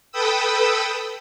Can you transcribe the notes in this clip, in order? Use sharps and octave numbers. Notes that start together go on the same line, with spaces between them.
A4 B4 G5 B5 D#6 E6